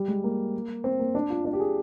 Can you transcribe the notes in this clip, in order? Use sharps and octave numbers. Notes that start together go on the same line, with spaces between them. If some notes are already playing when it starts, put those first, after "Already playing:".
Already playing: G3
G#3
A#3
C4
A#3
D4
F4
D4
G4
G#4